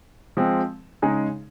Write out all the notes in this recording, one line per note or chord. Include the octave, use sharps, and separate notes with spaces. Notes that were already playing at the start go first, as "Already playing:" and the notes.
F3 G#3 C4
C#3 G#3 D#4 G#4